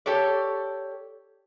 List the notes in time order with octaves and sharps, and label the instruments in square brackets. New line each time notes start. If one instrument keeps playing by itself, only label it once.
[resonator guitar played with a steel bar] G4 A4 C#5 D5